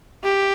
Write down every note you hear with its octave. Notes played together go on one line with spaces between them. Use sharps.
G4